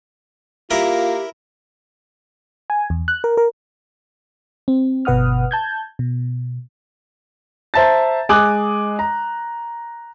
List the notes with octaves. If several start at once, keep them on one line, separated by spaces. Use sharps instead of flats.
A#3 E4 F4 G4 A#4
G#5
E2
F#6
A#4
A#4
C4
G1 B2 B4 F#5 D#6 F6
A5 G6 G#6
B2
C5 E5 A5 A#5 A6
G#3 G#5 D6 D#6 F#6
A#5